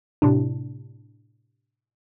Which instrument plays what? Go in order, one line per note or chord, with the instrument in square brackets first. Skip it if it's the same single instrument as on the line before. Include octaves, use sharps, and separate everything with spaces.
[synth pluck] A2 C3 D4